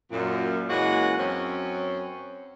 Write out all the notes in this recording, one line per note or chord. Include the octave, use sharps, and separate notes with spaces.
F#2 A#2
E3 G#3 A#3 C#4 F#4
F#2 C4 C#4